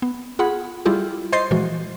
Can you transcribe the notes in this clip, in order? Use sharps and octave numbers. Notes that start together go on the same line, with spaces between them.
B3
F4 G#4 F#5 B5
G3 E4 F4 G4 G#4
C5 D#5 C6 G6 A6 C7
A#2 E3 F3 G#3 F#4